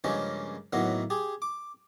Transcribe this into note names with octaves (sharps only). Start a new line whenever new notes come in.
G2 C#3 F3 G#3 A#3 C#4
A2 D#3 F#3 A#3 B3
G4 G#4
D6